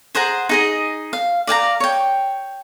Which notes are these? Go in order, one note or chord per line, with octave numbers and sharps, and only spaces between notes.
G#4 C5 F#5 A#5
D#4 G#4 D#5
F5
D5 F5 G5 A#5
C#5 G5